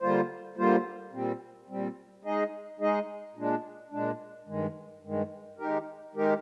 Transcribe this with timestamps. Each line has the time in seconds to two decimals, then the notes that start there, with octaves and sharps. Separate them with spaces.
0.01 D3 G3 A#3 F4 C5
0.57 D3 G3 A#3 F4 C5
1.13 A#2 G3 C4
1.68 A#2 G3 C4
2.24 G#3 D#4 G#4 D#5
2.80 G#3 D#4 G#4 D#5
3.35 A#2 G#3 D4
3.91 A#2 G#3 D4
4.47 G2 D#3 G#3
5.03 G2 D#3 G#3
5.59 D#3 G#3 D#4 G4 A#4
6.14 D#3 G#3 D#4 G4 A#4